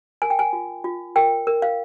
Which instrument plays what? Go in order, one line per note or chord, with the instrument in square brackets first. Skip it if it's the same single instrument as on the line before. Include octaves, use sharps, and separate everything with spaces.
[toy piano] A#4 G#5
G5
G#5
F4
F4
A#4 G5
A#4
F5